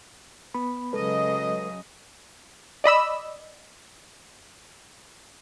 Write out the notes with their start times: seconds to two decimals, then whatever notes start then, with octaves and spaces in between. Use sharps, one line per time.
0.54 B3 B5
0.93 C#3 F#3 G#3 A4 B4 D#5
2.84 D5 D#5 B5 E6